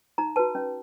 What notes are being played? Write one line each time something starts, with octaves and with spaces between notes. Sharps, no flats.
D#4 A#5
F#4 B4 A5
C#4